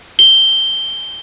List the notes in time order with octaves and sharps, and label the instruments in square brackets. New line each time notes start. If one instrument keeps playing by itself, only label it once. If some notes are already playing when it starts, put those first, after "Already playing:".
[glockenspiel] G7